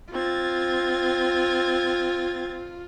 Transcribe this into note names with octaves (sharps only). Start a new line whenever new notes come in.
C4 F4 G#6 A6